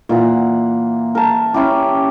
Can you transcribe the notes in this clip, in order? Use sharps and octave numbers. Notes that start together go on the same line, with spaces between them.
A#2 E3 F#5
A#4 A5
C#4 E4 G4